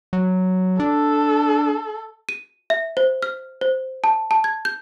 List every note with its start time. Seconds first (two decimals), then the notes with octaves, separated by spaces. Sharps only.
0.13 F#3
0.80 D4 A4
2.29 D#7
2.70 E5
2.97 C5
3.22 F6
3.61 C5
4.04 A5
4.31 A5
4.44 G#6
4.65 G6